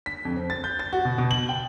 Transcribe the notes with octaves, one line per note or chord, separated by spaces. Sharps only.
B6
F2
C4
A6
G6
A6
F#4
B2
B2
F#7
G5